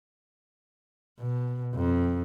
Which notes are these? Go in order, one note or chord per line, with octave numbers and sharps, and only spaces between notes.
B2
F2